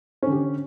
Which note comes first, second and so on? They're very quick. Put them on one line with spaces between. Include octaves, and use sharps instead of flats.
C#4 D3 G4